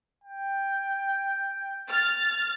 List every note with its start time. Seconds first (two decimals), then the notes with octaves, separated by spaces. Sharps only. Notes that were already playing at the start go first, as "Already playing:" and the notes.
0.24 G5
1.91 F6 A6